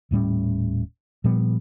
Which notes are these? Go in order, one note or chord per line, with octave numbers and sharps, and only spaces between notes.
D#1 A2 G3 C#4
A#2 F3 G3 B3